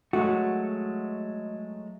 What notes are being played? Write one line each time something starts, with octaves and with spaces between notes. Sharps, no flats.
F#3 G#3 A3 F#4